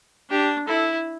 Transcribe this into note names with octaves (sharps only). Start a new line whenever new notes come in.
D4 G4
E4 A4